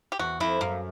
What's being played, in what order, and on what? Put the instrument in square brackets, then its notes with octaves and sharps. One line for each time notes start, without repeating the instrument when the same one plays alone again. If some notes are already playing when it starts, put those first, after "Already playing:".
[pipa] G4
[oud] E2 [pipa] F#4
[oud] F2 [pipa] E4
[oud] F#2 [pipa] A#3